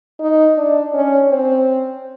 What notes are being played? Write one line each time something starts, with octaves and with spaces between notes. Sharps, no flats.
D#4
D4
C#4
C4